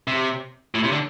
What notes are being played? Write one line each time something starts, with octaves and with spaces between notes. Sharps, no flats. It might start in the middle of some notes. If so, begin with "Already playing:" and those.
C3
A2
C3
D3